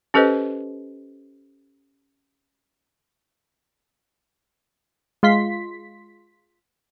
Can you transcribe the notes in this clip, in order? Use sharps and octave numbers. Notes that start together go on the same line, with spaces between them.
C#4 G4 A4 B4 C5 D#5
G#3 F4 C6 B6